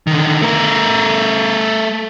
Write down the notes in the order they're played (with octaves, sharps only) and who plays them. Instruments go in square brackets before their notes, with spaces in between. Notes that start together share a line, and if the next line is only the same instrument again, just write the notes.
[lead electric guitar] D3 D#3
A3 A#4